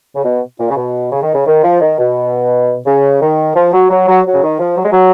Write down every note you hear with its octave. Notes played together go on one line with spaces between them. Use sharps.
C#3
B2
A#2
C#3
B2
C#3
D#3
C#3
D#3
F3
D#3
B2
C#3
D#3
F3
F#3
F#3
F#3
F#3
C#3
D#3
F3
F#3
G#3
F#3